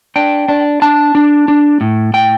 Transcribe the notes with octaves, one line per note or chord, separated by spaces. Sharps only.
D4 G5
D4
D4 A5
D4
D4
A2
A2 G5